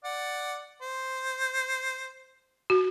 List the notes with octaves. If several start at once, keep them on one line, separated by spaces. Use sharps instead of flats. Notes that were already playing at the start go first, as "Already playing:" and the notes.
D5 F#5
C5
F#4